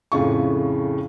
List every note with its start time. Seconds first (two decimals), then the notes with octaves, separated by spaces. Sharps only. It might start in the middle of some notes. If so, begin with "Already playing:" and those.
0.12 F2 A2 C#3 F4 C#6